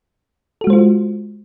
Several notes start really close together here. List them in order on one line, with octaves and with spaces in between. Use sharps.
A4 F#4 G#3 C5 F4